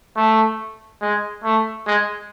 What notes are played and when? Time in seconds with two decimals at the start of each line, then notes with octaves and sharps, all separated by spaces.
0.16 A3
1.02 G#3
1.44 A3
1.87 G#3